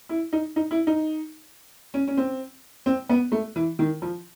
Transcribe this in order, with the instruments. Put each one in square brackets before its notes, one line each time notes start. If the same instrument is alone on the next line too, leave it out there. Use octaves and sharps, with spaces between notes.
[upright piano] E4
D#4
D#4
E4
D#4
C#4
C#4
C4
C4
B3
A3
E3
D#3
F3